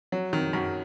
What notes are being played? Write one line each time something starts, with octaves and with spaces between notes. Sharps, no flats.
F#3
D#3
F#2